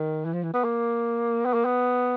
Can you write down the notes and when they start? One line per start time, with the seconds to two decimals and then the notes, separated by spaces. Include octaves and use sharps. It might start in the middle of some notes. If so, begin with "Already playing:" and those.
Already playing: D#3
0.25 E3
0.34 F3
0.43 E3
0.54 B3
0.65 A#3
1.45 B3
1.54 A#3
1.65 B3